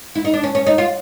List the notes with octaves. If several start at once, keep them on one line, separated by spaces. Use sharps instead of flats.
E4
D#4
D4
C#4
C#4
D#4
F4